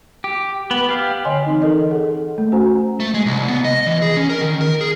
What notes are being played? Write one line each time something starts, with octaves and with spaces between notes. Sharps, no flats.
G4
B3
G4 F5
D3 C#5 D#5 G#5 C6
E3 C4 D#4
A4 A#4 D#5
G#4 A4 F#5
A3
C#4 F#4 C5 F#5 G#5 A#5
A3
G#3
C2
B3
D#5
E3
G#4
C#4
A#4
D#3
A#4
G#4